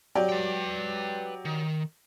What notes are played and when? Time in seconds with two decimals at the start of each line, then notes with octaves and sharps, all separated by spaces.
0.15 F#3 G4 D5
0.29 B4 G5
1.45 D#3